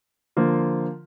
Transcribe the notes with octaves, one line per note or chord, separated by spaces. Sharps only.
D3 F3 A#3 F4